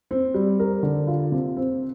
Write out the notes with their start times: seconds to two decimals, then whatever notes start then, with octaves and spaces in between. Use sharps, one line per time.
0.11 C4
0.34 G3
0.59 A#4
0.83 D3
1.07 F4
1.32 C3
1.57 C4